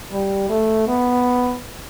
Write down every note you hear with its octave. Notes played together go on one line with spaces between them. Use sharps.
G3
A3
B3